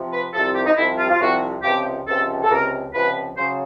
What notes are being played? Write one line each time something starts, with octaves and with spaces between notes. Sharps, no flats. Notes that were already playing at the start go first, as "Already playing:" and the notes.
Already playing: C3 F3
B4
C2 C3 F3 A4
A4
G4
D#4
C2 C3 F3 E4
F4
F4
C2 C3 F3 F#4
C#2 C3 F3 G4
C#2 C3 F3 A4
A4
C#2 C3 F3 A#4
C#2 C3 F3 B4
C#3 F#3 C5